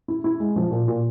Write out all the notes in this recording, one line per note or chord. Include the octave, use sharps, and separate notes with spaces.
E4
E4
G#3
F3
A#2
A#2